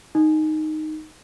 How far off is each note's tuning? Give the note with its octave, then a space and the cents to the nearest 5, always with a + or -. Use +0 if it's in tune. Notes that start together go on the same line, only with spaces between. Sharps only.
D#4 -5